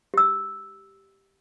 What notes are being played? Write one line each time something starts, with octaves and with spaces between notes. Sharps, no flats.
G4 E6